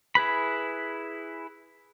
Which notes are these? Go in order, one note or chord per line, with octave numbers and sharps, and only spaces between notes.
E4 G#4 B4 B5